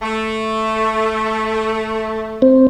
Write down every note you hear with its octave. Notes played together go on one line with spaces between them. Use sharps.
A3
C4